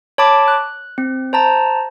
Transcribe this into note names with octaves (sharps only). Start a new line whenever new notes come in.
C#5 A5 B5 D6
F#6
C4
C5 A5 A#5